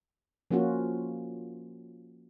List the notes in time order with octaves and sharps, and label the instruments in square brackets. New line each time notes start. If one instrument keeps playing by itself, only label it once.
[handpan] F3 A#3 C#4 F4 F#4